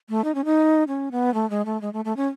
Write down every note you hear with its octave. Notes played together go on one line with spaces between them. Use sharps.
A3
D#4
C#4
D#4
C#4
B3
A3
G#3
A3
G#3
A3
A3
C#4